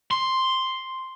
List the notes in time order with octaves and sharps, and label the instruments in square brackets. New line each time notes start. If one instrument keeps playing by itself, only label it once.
[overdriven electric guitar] C6